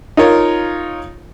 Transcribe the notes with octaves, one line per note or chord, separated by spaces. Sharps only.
D#4 F4 A#4 C#5